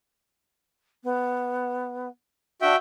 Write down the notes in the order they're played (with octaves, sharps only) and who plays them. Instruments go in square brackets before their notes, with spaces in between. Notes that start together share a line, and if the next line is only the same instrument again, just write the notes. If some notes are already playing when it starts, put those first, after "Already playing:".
[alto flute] B3
[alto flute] D4 [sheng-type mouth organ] F#4 E5 G5